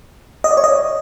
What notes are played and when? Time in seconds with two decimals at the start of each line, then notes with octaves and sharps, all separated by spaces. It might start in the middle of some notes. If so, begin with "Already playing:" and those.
0.44 D#5
0.51 D5
0.57 C#5
0.64 D#5